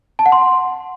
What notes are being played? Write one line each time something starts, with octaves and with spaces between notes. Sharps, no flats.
A5
F#5
C6